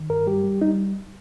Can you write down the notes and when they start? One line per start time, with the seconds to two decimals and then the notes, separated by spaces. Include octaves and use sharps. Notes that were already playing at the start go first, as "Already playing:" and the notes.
Already playing: D#3
0.10 G2 A#4
0.27 G3 G4
0.44 G3
0.62 G3 D#4